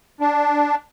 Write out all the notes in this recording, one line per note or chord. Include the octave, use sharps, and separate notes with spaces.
D4